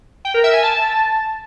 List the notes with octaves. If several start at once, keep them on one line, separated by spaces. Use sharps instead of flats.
G5
A#4
E5
G#5
A5